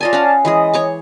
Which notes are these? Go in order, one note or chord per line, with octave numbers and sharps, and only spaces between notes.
F4 D5 D#5 G#5 A5
C#4 F5 F#5
E3 G#3 G#4 D#5
C#5 C#6 D6